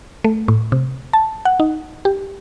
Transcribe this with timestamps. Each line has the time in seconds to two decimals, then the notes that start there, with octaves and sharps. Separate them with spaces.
0.24 A3
0.48 A2
0.72 C3
1.13 A5
1.45 F#5
1.60 D#4
2.05 G4